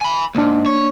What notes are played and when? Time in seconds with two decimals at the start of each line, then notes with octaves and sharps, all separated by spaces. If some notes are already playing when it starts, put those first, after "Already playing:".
0.01 G#5 B5
0.35 C2 G#2 A#3 D4
0.66 C#5